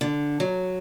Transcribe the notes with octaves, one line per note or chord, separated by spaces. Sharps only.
D3
F#3